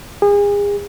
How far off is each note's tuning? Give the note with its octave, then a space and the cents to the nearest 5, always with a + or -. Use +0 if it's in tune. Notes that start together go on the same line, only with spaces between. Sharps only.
G#4 -35